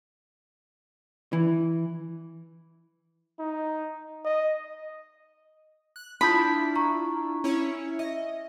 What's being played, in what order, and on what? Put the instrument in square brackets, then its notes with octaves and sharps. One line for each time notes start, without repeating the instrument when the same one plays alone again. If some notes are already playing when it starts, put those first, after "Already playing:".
[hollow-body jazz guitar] E3
[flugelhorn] D#4
D#5
[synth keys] F#6
[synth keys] D4 E4 F4 [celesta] A5 D#6 G6 [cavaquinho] B5
[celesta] A#5 C#6
[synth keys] C#4 E4 C#5
[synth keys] D#5 [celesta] E5